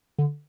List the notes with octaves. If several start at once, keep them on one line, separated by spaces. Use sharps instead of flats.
D3